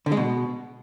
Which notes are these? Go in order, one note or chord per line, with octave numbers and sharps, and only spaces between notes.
D3
G#3
B2